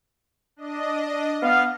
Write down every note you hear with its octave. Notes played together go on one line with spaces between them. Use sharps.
D4 D#5
B3 F5